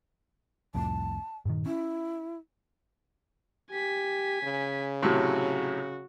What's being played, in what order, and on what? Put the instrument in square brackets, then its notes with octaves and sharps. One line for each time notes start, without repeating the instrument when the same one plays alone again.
[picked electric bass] C2 F2 A2 [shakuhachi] A5
[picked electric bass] G2 A#2 D#3
[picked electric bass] C#4 [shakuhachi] E4
[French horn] G4 [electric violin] G#5 B6
[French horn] C#3
[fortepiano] A2 C3 F#3 [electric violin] F#4